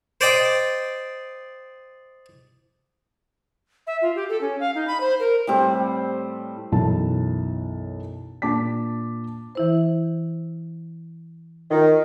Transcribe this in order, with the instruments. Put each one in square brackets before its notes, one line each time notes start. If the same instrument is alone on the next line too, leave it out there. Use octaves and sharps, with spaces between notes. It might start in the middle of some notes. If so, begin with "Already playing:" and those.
[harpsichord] C5 D5 D#5 G5
[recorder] E5
F4
G4
A4
C#4
F5
D#4
B5
C5
A#4
[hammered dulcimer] A2 G3 C4 A4
[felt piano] B1 F#2 E3 E4 A5
A#2 D4 A5 D6 B6
[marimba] E3 E4 C5
[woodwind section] D#3 [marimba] F4